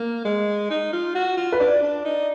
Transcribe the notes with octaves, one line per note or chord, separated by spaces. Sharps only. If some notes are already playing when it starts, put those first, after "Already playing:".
Already playing: A#3
G#3
D#4
F4
F#4
F4
B4
D4 D5
D4
D#4